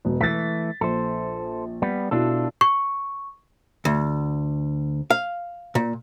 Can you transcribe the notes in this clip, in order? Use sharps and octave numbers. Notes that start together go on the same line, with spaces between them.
E1 B2
E3 A3 A6 B6
A#1 A4 C5
G3 B3
B2 D4 E4 F4 A4
C#6
D2
F5
A#2